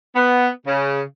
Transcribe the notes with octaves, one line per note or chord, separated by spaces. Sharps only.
B3
C#3